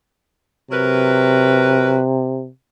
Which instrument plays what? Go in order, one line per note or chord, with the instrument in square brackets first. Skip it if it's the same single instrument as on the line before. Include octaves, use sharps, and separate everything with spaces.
[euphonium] C3 [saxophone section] F#3 A#4 B4